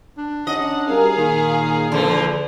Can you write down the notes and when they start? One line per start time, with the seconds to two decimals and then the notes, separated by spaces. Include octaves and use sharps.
0.18 D4
0.47 C#4 D#4 D#5 F#5
0.88 G3 F#4 G#4 A#4 F5
1.18 A#2 D#3
1.92 E2 D3 F3 D4